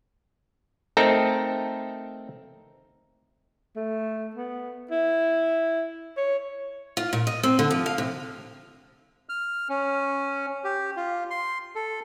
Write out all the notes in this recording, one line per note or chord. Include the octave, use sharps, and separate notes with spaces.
A3 C4 D#4 A4 A#4 A#5
A3
B3
E4
C#5
F4
A#2
D#5
C4
D3
F3
F5
C3
F6
C#4
G4
F4
C6
A4